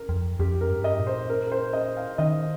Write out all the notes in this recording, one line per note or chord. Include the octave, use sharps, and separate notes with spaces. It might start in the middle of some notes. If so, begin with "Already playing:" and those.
Already playing: A#4
F2
F2 G4
A#4
G2
D#5
A#2
C5
A#4
A#4
C5
D#5
F5
D#3 D#5